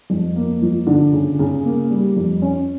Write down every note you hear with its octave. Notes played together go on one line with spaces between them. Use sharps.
F2
A#3
F3
D3
C#3
C#3
A#3
G3
F2
C#4